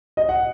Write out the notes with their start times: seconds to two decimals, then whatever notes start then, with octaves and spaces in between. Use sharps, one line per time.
0.17 D#5
0.29 F#5